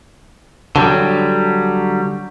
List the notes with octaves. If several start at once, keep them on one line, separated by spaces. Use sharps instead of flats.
D3 F#3 G3